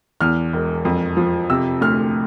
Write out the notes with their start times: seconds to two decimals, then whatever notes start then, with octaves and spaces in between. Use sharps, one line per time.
0.21 E2 F6
0.53 E1
0.85 F2
1.17 F3
1.50 C3 E6
1.81 D2 F6